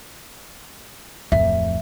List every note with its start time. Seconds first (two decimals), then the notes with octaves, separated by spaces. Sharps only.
1.32 D1 F2 E5